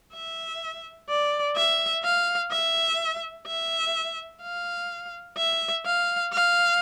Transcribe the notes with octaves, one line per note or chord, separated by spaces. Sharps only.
E5
D5
E5
F5
E5
E5
F5
E5
F5
F5